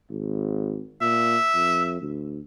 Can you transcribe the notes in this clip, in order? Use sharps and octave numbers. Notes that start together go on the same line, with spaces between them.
G#1
A#2 E5
F2
D2